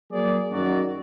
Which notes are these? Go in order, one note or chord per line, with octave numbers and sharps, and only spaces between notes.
F#3 A#3 G#4 D5
F#2 D#3 F#3 F#4 D5